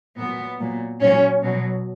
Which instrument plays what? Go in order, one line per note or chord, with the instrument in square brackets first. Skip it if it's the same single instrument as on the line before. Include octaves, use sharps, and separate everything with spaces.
[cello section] A#2 F#3 B3
A#2 F#3
A#2 F#3 C#4
B2 F#3